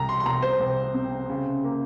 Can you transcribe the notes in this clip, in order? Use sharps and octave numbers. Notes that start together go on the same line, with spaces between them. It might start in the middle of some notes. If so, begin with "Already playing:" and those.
Already playing: C2 A#5
C6
C6
C2 A#5
C5
C2
C3
C#3
A#3